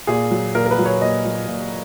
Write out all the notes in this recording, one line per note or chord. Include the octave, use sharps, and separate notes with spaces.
A#2 G#4
F#3
A#2 A#4
A#4
B4
F#3
C#5
A#2 D#5
F#3
A#2